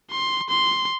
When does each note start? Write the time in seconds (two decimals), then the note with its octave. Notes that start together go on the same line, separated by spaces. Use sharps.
0.11 C6
0.49 C6